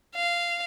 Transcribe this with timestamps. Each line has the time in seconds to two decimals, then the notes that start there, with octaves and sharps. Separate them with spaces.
0.15 F5